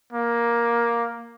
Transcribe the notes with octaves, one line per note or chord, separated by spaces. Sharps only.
A#3